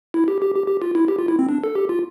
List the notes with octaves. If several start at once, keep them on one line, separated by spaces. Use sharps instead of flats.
E4
G4
G4
G4
G4
F4
E4
G4
F4
E4
C4
D4
A4
G4
F4